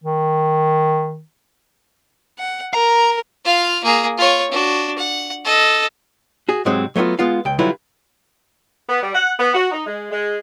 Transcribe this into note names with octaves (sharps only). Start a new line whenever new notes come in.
D#3
F#5
A#4 A#5
F4 F5
A#3 G#4
F4 C#5
D4 F#4
F#5
A4 D#5
F#4 G#4
G#2 C3 F#3 G#3 C4
F#3 A3 B3 C4 F4
G#3 B3 F4 F5
C#2 G5
D3 F#3 G3 E4 F4 B4
B3
G3
F#5
B3
F#4
D#4
G#3
G#3